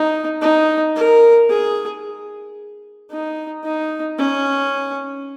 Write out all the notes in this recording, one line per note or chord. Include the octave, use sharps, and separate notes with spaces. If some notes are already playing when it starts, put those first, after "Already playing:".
Already playing: D#4
D#4
A#4
G#4
D#4
D#4
C#4